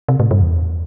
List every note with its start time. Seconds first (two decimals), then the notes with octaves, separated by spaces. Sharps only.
0.09 C3
0.20 A2
0.31 G2
0.42 E2